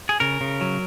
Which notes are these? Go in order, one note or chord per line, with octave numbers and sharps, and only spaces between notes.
G#4
C#3 A#4
C#3
F#3